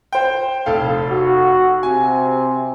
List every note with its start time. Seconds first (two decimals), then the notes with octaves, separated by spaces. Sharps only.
0.13 C5 G5
0.66 F1 A4 F5
1.10 F#4
1.83 C3 G#5